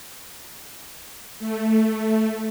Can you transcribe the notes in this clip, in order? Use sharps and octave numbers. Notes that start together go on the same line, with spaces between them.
A3